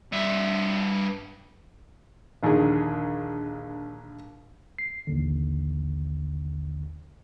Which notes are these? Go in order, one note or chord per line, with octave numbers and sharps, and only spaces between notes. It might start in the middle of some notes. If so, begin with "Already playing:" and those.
G2 E5
A#1 D#2 D3 G#4
C7
A1 D#2 D3